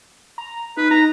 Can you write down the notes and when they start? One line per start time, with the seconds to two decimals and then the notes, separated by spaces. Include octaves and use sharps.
0.38 A#5
0.77 D#4 B4
0.91 D#4 A#5